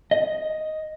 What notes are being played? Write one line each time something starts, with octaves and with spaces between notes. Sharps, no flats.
D#5